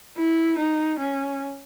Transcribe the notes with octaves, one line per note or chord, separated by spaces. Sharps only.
E4
D#4
C#4